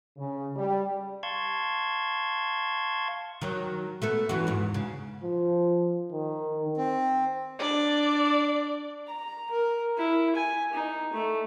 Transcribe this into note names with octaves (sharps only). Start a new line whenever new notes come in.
C#3
G3
F5 A5 C6 C#6 G#6
D#3 F#3
A3 B3 A4
F#2 E3 F#4
E2 G#2
C#3
F3
D#3
C4
D4 D5
A#5
A#4
E4
G#5
D#4
A3